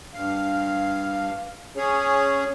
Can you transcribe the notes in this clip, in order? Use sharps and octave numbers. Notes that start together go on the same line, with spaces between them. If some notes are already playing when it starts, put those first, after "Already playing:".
G2 F5
C#4 G#4 C#5